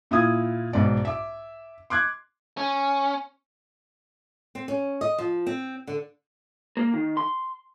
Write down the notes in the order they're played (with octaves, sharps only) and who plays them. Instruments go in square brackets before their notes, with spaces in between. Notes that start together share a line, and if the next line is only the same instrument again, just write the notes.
[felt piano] A#2 E4 F4 D#6 G#6
B1 G#2 D5
E5 D6
C6 D6 F#6 G#6
[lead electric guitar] C#4
[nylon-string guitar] C4
C#4
D#5
F3
C4
D3
[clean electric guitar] A#3
D#3
C6